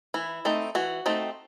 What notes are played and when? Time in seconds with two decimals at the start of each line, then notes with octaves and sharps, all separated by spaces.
0.14 E3 E4
0.45 A3 C4 D#4
0.75 E3 F#4
1.06 A3 C4 D#4